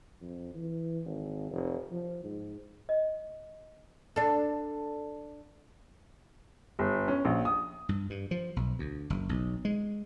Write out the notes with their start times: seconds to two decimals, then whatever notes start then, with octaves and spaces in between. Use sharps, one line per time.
0.21 F2
0.55 E3
1.05 G#1
1.51 F1
1.91 F3
2.24 G#2
2.89 D#5
4.16 D4 A4
6.79 G1
7.08 C#4
7.25 A#1
7.45 D#6
7.89 G2
8.10 G2
8.31 F3
8.56 B1
8.79 D2
9.10 F#1
9.29 B1
9.65 G#3